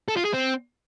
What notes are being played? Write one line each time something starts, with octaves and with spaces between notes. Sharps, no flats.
A4
F4
G#4
C4